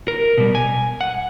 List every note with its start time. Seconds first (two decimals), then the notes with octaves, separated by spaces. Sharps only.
0.08 A#4
0.38 B2 G3
0.55 G#5
1.01 F#5